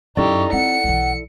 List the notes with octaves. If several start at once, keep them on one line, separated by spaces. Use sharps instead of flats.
F#2 D#4 E4 G4 A4 D5 C#6
C4 F#5 C#7
B1 E3